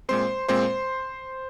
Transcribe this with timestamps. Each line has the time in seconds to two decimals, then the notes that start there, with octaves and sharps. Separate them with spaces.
0.09 A#2 G#3 C4 C5 C6
0.48 A#2 G#3 C4 C5 C6